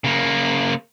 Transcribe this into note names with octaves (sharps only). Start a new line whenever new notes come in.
C#3 A#3